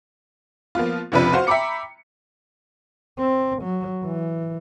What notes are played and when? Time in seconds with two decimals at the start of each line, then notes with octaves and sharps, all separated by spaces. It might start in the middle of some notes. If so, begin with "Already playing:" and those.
0.75 F3 A#3 B3 F4
1.12 F1 C#2 C3 F3 D4 B4
1.33 F#4 C5 F5 C6
1.47 E5 G5 A#5 B5 D6 C#7
3.19 C4
3.63 F#3
4.04 E3